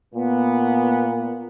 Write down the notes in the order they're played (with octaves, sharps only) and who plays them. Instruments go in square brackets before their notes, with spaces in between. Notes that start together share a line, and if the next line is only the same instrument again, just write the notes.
[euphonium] A#2 [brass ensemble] B3